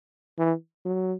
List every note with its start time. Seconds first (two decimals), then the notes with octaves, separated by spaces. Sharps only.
0.38 E3
0.85 F#3